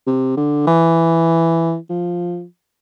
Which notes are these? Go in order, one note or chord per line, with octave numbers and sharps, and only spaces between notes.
C3
D3
E3
F3